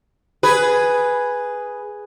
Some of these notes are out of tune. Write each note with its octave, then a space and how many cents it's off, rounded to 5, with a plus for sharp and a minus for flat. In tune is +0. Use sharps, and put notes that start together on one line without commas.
G#4 +0 B4 +0